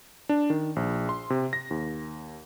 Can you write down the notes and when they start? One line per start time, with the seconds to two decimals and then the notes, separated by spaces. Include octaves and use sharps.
0.29 D4
0.50 D#3
0.76 A#1
1.09 C6
1.30 C3
1.53 A#6
1.71 D#2